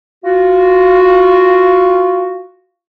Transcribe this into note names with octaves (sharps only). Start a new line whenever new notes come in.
F4 F#4